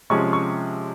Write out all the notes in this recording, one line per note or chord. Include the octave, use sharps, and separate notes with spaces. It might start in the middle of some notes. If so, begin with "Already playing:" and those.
C3 F3 G#3 C#4 C#6
C#6